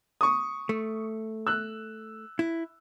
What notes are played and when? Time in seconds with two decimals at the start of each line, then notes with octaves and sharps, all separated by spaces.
0.21 C#6 D#6
0.69 A3
1.47 E6 F#6
2.39 E4